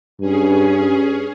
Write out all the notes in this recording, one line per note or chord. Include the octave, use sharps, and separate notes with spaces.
G2 C#4 G#4